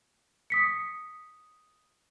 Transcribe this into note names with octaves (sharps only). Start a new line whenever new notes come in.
D#6 B6 C#7